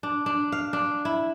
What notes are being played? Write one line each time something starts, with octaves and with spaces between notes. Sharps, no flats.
D4
D4
F5
D4
E4